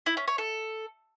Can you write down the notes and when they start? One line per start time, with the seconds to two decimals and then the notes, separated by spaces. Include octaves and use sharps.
0.06 E4
0.17 C#4
0.28 C#5
0.38 A4